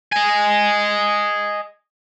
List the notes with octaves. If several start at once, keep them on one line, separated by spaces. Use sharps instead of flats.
D#5 G#5